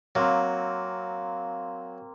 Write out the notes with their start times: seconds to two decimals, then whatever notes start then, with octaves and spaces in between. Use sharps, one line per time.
0.15 F#3 A#3 C4